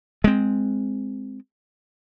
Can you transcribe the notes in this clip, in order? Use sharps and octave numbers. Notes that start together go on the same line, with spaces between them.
G#3 C4